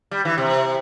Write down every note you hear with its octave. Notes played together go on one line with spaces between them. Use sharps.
G3
E3
C3